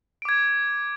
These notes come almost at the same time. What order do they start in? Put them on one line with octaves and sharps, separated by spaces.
D7 D6 G#6